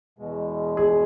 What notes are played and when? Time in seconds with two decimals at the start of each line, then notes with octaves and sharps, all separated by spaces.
0.19 E2 B2 G#3
0.77 G#4